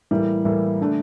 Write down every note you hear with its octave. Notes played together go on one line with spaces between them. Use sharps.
A2 E3 G3 A#3
A2 E3 G3 A#3
D3 A3 D4